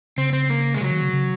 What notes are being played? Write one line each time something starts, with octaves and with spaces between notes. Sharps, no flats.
C#3 C4
C4
A#3
G#3
C#3 F#3
D#3
C#3
C#3